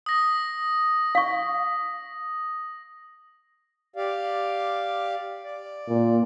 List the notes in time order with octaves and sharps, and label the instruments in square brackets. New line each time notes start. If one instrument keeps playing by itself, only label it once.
[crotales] D#6 A#6
[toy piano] F5 C#6
[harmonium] G4 D5 F5
D5
[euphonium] A#2